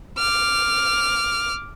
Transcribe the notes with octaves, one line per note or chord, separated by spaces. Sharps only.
D6 F6